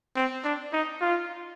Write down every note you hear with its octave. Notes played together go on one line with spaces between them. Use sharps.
C4
D4
D#4
F4